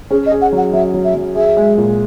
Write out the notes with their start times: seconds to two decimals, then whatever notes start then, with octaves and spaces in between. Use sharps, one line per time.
0.11 C#4 G#4
0.26 D#5
0.32 G#4
0.42 F#5
0.53 F#3 F#5
0.73 F#3 E5
0.94 F#3
1.04 E5
1.15 F#3
1.36 G#4 E5
1.57 G#3
1.78 A#2